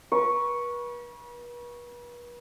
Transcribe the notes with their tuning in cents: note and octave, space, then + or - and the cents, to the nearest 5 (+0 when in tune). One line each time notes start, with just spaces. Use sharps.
B4 -40 C#6 +0